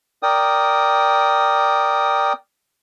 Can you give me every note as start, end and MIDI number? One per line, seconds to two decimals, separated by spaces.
0.23 2.33 70
0.23 2.33 74
0.23 2.33 79
0.23 2.33 87